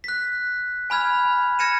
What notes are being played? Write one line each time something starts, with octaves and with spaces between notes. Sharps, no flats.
F#6 B6
G#5 B5 F6 G#6 F7
F6 G#6 A#6 C#7 D#7 E7